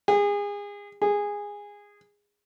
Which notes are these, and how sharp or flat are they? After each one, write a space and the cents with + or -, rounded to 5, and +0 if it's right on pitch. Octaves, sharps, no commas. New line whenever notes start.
G#4 -30
G#4 -15